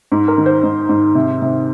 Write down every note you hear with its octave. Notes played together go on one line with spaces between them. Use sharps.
G#2
A#4
D#3
C5
G#2
G#2
C3
C3